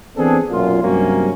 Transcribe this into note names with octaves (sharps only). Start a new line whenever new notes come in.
E3 B3 C4 D4 G#4 A4
B1 F#2 A#2 F4
G2 C3 F#3 A#3 C#4